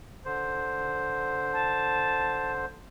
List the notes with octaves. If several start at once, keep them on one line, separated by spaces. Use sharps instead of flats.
D3 C5
A5